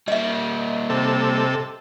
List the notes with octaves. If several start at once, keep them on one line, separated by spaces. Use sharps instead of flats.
G3 A#3 D#5 E5
C3 A4